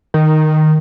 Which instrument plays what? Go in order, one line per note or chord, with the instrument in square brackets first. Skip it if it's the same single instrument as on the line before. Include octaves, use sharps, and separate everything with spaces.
[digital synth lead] D#3